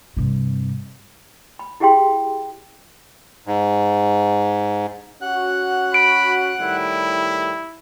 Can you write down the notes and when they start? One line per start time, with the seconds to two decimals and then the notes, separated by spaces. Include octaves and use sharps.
0.17 G2 C3
1.59 B5
1.80 E4 G4 G#4 F5 G5 C6
3.47 G#2
5.22 C#4 F#4 F#5 F#6
5.94 B5 D7
6.60 A2 D#3 G3 E4